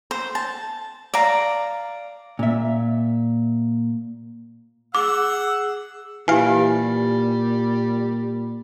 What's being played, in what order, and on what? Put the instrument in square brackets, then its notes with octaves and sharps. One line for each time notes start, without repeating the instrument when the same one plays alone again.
[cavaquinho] C5
A5
D5 F5 A#5
[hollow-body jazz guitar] A#2 E5
[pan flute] G#4 [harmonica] F#5 E6 [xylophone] D6
[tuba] A#2 [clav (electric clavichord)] E3 F5 [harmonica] G3 [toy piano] G4 E5 G#5